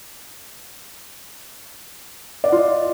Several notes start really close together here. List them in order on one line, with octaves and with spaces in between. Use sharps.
D5 F#5 F4 D#5